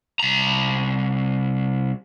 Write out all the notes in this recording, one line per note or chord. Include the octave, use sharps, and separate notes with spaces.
C2 A#5